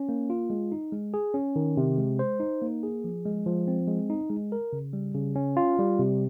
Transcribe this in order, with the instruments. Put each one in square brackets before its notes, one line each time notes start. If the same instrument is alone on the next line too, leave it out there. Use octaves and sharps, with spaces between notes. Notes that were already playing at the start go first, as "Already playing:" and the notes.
Already playing: [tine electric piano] C#4
A#3
F4
G#3
D#4
G#3
G#4
C#4
D#3
C3
G#3
C5
D#4
A#3
G#4
F3
G#3
F3
C4
G#3
D#4
G#3
A#4
C#3
G3
C#3
C#4
F4
G3
C3